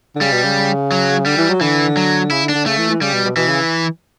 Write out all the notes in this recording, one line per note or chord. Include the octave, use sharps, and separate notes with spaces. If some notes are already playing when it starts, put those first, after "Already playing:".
D3
C#3 G3
B2
C#3
F#3
D3 G3
E3
F#3
D3 E3
F#3
C#3 E4
D3
D4
D3
C#3 A3
E3
E3
C#3 G3
B2
B2
B2 E3
C#3